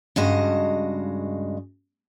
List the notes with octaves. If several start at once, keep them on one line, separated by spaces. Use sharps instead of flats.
G2 C#3 G#3 F#4 D#5 A5